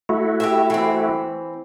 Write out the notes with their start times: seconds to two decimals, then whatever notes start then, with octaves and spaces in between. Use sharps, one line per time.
0.09 A3 E4 F#4
0.40 G4 C5 E5
0.70 E3 C4